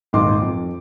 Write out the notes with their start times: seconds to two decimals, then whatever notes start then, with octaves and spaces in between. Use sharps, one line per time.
0.13 D#1 G#1 D#3 D#5 C6 D6
0.42 F2